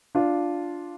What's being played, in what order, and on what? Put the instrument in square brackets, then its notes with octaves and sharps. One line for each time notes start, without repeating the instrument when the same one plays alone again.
[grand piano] D4 F4